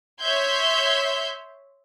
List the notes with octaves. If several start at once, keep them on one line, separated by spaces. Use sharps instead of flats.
C#5 E5 C6 G6 G#6